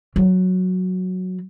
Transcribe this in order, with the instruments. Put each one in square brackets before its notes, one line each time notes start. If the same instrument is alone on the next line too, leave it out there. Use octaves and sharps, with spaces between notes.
[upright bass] F#3